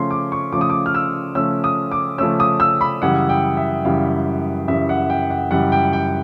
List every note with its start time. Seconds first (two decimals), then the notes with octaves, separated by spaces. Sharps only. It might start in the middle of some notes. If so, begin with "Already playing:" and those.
Already playing: C#3 F3 A3 C#4 C6
0.11 D6
0.32 C#6
0.52 C#3 F3 A3 C#4 D6
0.61 D#6
0.70 D6
0.86 F6
0.95 E6
1.35 C#3 F3 A3 C#4 E6
1.64 D#6
1.91 D6
2.18 C#3 F3 A3 C#4 E6
2.40 D#6
2.60 E6
2.81 B5
3.02 F#2 C#3 E3 G3 F#5
3.29 G5
3.57 E5
3.85 F#2 C#3 E3 G3 F5
4.68 F#2 C#3 E3 G3 E5
4.89 F#5
5.10 G5
5.30 F#5
5.51 F#2 C#3 E3 G3 F#5
5.72 G5
5.93 G5